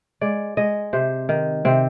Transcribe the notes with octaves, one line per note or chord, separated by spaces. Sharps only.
G#3 D5
G#3 D#5
C3 C5
D#3
C3 C4